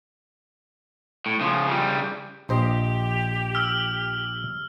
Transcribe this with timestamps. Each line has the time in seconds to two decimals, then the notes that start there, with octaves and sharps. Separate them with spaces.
1.26 A2
1.41 C#3 F3
1.67 C#3 G3
2.49 A#1 G4 C5 D#5
3.55 E6 F6